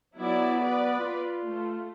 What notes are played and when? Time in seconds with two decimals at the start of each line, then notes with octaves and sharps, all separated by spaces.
0.16 F#3 B3 E4 D5
0.63 B4 D5
0.99 F4
1.42 A3